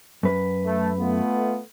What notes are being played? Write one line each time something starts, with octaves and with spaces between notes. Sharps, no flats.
F#2 B4
A3
A3 B3 F4